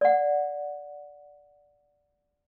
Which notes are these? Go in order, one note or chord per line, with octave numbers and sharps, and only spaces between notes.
D5 F#5